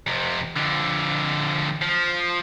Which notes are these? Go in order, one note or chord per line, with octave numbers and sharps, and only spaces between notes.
F2 C3
F2 D3
F3